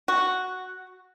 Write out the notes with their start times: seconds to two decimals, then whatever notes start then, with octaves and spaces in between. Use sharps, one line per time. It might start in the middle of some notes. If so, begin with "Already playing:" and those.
0.08 F#4